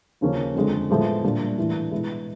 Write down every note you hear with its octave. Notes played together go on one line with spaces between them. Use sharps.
D#2 C#3 F3 A#3 C#4
F2 D3 F3 G#3
A2 F3 G#3 B3
A#2 G3 A#3 D4
A2 E3 A3 D4
B2 G#3 B3 E4